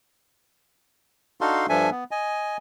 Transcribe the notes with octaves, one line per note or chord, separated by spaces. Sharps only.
D4 D#4 F#4 A4 F5 C6
G2 F3 D4 A4 E5 G#5
B3
D#5 G#5